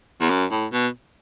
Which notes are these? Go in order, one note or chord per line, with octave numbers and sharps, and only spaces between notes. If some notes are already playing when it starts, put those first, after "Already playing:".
E2
F#2
A2
B2